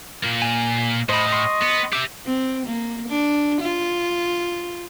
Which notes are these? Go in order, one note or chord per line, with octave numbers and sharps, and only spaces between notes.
A#2 A#3
G#5
A2 C5 D#5 B5
C6 C#6
B3
G4 E5 D6
C4
A#3
D4
F4